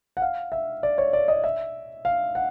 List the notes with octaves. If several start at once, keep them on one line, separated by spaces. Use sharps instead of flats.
F#5
F5
E5
D5
C#5
D5
D#5
E5
F5
F#5